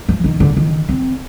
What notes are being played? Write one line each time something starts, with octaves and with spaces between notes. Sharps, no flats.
F3
D#3
D3
D#3
C4